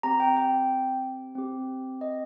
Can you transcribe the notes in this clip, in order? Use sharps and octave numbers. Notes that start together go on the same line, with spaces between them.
C4 G4 A#5
G5
G5
C4 G4
D#5